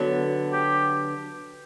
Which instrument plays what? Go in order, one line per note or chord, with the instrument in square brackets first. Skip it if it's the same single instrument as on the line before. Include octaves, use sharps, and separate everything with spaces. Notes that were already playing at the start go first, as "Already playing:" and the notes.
Already playing: [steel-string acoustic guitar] D3 F#3 B3
[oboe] G4